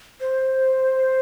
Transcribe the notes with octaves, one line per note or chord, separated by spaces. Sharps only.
C5